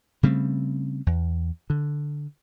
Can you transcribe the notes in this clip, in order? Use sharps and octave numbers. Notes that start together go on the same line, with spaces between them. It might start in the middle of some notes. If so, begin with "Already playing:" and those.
C#3 G3 A3 C4
E2
D3